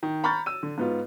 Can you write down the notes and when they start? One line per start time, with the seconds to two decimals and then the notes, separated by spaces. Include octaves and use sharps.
0.03 D#3
0.24 A#5 B5 C#6 F6 G6 A6
0.46 E6 D#7
0.63 D3
0.78 G#2 B3 F4